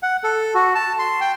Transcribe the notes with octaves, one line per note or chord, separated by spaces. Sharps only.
F#5
A4
F#4
A5
C6
G5